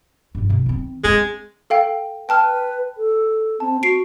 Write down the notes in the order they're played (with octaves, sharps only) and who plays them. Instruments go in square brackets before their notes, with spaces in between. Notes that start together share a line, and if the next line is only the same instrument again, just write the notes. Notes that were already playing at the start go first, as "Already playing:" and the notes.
[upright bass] G2 F3
C3 D4
D#3 C4
[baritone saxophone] G#3 [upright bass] C4 D4
[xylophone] A4 F5 G5
[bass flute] B4 [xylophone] G5 A5 F6
[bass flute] A4
[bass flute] C4 [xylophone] A5
[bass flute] F#4 [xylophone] C7 D7